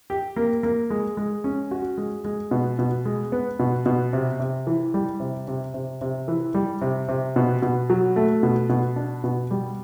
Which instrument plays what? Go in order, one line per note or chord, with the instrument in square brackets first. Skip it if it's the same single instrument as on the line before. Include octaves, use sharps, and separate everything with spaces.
[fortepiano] G4
A#3
A#3
G#3
G#3
C#4
F#4
G#3
G#3
B2
B2
G#3
B3
B2
B2
C3
C3
E3
G3
C3
C3
C3
C3
E3
G3
C3
C3
B2
B2
F#3
A3
B2
B2
D4
B2
G3